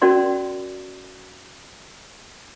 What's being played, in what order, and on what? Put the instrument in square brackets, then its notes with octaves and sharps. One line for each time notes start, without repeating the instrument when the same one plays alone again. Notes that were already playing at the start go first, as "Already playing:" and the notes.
[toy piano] C#4 F#4 A#4 D5 C6